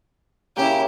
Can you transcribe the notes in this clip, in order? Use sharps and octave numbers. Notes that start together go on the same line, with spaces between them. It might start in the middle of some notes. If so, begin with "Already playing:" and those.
C#3 A#3 E4 G4